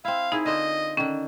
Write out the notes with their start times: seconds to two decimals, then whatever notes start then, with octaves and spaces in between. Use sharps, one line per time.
0.05 C4 E4 F5
0.32 D#4 E4 G#4 A#4
0.46 D3 F4 C5 D#5
0.97 D3 D#3 C#4